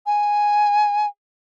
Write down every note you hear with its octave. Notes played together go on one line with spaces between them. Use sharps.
G#5